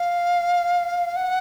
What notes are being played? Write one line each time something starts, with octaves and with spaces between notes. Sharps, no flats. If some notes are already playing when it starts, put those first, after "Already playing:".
Already playing: F5
F#5